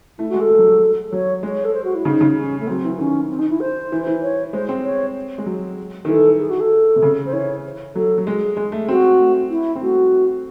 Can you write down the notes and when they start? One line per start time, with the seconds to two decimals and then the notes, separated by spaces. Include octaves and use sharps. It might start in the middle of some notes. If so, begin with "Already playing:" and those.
0.19 A3 E4
0.30 F#4
0.34 G#3
0.40 A4
0.49 G#3
0.58 F#3
0.67 G#3
1.12 F#3 C#5
1.43 G#3 C#5
1.65 A4
1.74 C5
1.84 F#4
1.95 E4
2.05 C#3 D#4
2.21 C#3
2.36 C#4
2.60 A3
2.67 F#3 C4
2.85 E3
2.98 D#3 C#4
3.29 C4
3.39 D#4
3.50 E4
3.60 C5
3.92 E3
4.07 E3
4.22 C#5
4.53 G#3 C5
4.69 C4
4.84 C#5
5.38 G#3
5.46 F#3
6.05 D#3
6.08 E3 A4
6.39 G#4
6.50 F#4
6.60 A4
6.96 C3
7.02 C#3
7.26 C5
7.33 E3 C#5
7.95 F#3 A4
8.18 F#3
8.27 G#3 G#4
8.57 G#3
8.72 A3
8.88 C4 F#4
9.19 A3
9.50 E4
9.76 C4
9.81 A3 F#4